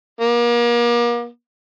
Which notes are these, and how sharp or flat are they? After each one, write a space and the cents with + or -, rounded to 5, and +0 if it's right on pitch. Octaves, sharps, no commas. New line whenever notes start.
A#3 +35